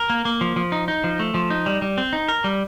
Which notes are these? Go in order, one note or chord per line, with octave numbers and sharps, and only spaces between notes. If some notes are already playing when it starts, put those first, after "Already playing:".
Already playing: A#4
A#3
A#3
F3
F3
D#4
D#4
F3
A3
F3
D#4
G3
G3
C4
D#4
A#4
G3